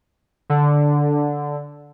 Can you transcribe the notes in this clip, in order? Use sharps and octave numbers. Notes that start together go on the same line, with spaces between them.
D3